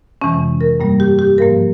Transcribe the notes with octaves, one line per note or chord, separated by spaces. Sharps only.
F2 C3 E3 G#3 C#4
A#4
G2 G3 A#3
G4
G4
G#2 F3 A#3 A#4